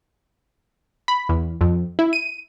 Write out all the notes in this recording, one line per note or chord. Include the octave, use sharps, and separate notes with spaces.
B5
E2
F2
E4
D#7